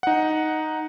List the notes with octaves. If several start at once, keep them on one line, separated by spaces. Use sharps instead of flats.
D#4 F#5